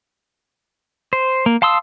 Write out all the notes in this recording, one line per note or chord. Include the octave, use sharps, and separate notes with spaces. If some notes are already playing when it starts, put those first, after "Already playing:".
C5
A#3
F5 A5 C6 D#6 E6